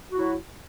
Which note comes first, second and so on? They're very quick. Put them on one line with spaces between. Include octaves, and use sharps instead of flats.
F#4 E4 F#3